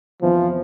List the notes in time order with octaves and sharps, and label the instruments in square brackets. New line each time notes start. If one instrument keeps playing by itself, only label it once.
[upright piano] E2 C3 E3 B3 E4 [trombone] F3